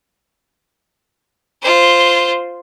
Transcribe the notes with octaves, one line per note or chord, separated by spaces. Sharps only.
F4 C5